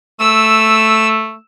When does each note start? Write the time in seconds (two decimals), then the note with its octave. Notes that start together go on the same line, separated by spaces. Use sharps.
0.20 A3 E6